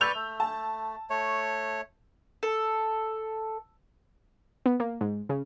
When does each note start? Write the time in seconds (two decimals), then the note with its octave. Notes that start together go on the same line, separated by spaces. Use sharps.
0.01 B4 D5 C#6 E6 G6 F7
0.15 A3
0.40 A5
1.10 A3 C#5
2.43 A4
4.66 B3
4.80 A#3
5.01 G#2
5.29 C#3